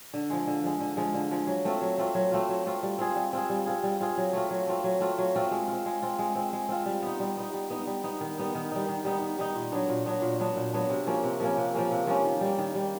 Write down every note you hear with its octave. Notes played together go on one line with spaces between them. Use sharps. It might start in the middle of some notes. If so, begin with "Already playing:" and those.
D3
F3 G#3
D3
F3 G#3
D3
F3 G#3
D3
F3 G#3
F#3
A3 C4 F4
F#3
A3 C4 F4
F#3
A3 C4 F4
F#3
A3 C4 F4
G3
C4 F4 G#4
G3
C4 F4 G#4
G3
C4 F4 G#4
G3
C4 F4 G#4
F#3
A3 C4 F4
F#3
A3 C4 F4
F#3
A3 C4 F4
F#3
A3 C4 F4
G#3
F4
C4
G#3
C4 F4
G#3
C4 F4
G#3
C4 F4
G3
B3 D#4
G3
B3 D#4
G3
B3 D#4
G3
B3 D#4
D#3
G3 B3 D#4
D#3
G3 B3 D#4
D#3
G3 B3 D#4
D#3
G3 B3 D#4
A#2
F#3 B3 D4
A#2
F#3 B3 D4
A#2
F#3 B3 D4
A#2
F#3 B3 D4
C3
F3 A#3 C#4
C3
F3 A#3 C#4
C3
F3 A#3 C#4
C3
F3 A#3 C#4
D#3
G3 A#3
D#3
G3 A#3